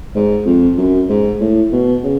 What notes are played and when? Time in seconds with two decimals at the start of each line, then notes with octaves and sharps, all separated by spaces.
0.15 G#2
0.46 F2
0.78 F#2
1.09 G#2
1.40 A2
1.72 B2
2.03 C#3